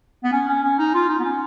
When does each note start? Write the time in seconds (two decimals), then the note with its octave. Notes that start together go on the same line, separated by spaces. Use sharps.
0.24 B3
0.32 C#4
0.48 C#4
0.63 C#4
0.78 D#4
0.94 F4
1.09 D#4
1.19 B3
1.25 C#4